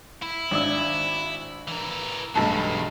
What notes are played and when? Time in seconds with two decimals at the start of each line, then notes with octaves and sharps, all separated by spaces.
0.22 E4
0.51 G#1 D4 E6
1.68 E3 A#4
2.36 B1 E2 G2 G#3 A4 A5